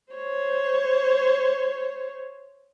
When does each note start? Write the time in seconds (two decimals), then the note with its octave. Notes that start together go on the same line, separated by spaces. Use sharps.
0.13 C5 C#5